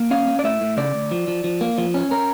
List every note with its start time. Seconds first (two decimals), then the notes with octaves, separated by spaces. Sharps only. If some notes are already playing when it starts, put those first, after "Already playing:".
Already playing: A#3
0.11 C#4 F5
0.27 C#4
0.39 D5
0.44 A2 E5
0.61 A2
0.77 C#3 D5
0.94 D2
1.11 F3
1.28 F3
1.44 F3
1.61 A#3
1.78 F3
1.94 C#4
2.11 C#4 A#4